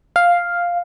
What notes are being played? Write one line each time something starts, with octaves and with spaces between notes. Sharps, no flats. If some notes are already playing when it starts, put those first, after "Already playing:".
F5